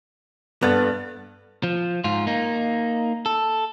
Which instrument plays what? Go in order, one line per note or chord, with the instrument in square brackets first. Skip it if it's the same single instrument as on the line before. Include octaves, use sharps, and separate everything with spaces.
[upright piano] G2 A4 A6 [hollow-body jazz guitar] B3
[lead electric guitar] F3
G#2 F4
A#3 D#4
A4